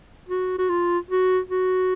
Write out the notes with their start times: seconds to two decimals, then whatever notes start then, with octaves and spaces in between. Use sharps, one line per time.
0.29 F#4
0.59 F#4
0.70 F4
1.11 F#4
1.50 F#4